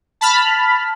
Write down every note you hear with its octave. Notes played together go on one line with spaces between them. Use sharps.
A5 B5 F6